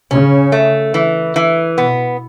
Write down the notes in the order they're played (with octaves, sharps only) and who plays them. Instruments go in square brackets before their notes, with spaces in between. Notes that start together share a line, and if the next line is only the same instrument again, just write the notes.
[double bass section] C#3 [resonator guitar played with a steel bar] C#4
[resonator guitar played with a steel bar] A3
E3
E3
[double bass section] B2 [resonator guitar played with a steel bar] B3